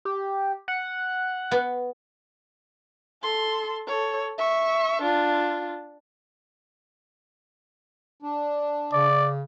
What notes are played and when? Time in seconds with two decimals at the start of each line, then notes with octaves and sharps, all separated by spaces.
0.05 G4
0.68 F#5
1.51 B3
3.22 A4 C6
3.87 A4 C#5
4.38 E5 C#6
5.02 D4 F4
8.23 D4
8.93 C#3 D5